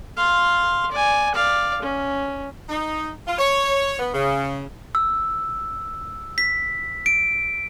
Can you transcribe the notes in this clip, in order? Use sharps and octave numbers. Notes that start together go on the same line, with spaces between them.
F5 C6
D5 G#5
D5 F5
C#4
D#4
F4
C#5
B3
C#3
E6
B6
D7